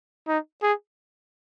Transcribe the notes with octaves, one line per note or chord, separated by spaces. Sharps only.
D#4
G#4